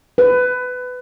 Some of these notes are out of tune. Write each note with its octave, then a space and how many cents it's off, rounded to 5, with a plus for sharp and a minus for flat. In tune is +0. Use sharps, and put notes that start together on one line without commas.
B4 +20